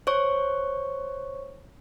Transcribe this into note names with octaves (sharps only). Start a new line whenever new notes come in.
C5 C#5 C#6